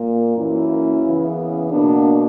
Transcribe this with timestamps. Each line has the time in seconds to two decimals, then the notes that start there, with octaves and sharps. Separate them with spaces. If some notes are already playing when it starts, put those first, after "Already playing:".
Already playing: A#2 A#3
0.36 F#2 E3 A#3 C#4 E4
1.04 C#3 E3 B3
1.71 B2 A#3 B3 D4